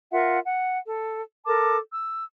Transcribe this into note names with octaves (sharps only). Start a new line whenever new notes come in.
F4 A#4 E5 F#5
F#5
A4
A4 A#4 A5 D6
E6